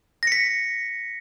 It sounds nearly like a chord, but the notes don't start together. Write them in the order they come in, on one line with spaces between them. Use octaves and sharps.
A#6 C#7 B6